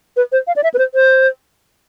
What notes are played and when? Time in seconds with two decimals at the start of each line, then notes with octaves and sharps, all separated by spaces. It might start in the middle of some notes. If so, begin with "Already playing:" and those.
0.17 B4
0.32 C5
0.47 F5
0.56 D5
0.63 E5
0.74 B4
0.78 C5
0.94 C5